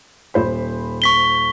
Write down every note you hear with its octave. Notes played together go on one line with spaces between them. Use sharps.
D#1 C5 B5
C#6 B6 G7